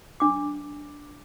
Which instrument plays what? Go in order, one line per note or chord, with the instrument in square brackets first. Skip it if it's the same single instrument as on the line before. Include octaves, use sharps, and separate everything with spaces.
[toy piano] D4 D6